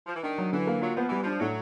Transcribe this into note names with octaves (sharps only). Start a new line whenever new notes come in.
F3
E3
D#3 D4
F#3
D3 E3
A#3
F#3 F4
F3 B3
E3 G3
F3 D4
A2 F#3